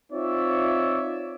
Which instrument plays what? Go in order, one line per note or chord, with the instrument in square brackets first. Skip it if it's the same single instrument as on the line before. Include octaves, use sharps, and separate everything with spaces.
[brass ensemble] C4 D#4 F4 C#5 D5 E5